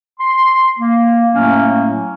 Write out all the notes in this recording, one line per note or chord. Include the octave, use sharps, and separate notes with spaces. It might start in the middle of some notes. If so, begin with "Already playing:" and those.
C6
A#3
A2 F#3 A3 A#3 C#4